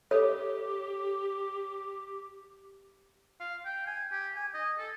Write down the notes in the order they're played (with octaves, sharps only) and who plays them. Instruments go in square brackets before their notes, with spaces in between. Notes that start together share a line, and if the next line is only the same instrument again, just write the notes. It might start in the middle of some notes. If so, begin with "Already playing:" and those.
[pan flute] G4 [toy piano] A4 C#5
[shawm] F5
G5
G#5
G4
G#5
D#5
A4